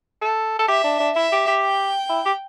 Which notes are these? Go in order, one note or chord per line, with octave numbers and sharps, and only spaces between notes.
A4
A4
G4 E5
D4
D4
E4 E5
G4
G4
G5
E4
G4